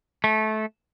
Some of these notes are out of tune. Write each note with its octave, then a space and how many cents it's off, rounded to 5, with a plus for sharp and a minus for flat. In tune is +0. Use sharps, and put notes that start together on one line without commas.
A3 -20